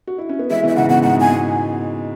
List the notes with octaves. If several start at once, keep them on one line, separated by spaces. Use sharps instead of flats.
F#4
E4
C#4
B3
E3 G#3 E5
B2 E3
E5
G#2 C#3 F#5
B2 F#5
G#2 F#5
B2
G#5